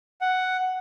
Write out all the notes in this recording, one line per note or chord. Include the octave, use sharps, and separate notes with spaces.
F#5